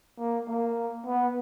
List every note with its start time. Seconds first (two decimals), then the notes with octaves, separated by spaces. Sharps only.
0.19 A#3
0.49 A#3
1.06 B3